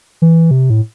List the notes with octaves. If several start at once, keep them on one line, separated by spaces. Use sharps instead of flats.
E3
C3
A2